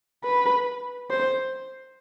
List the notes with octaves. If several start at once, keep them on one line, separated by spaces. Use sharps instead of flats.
B4
C5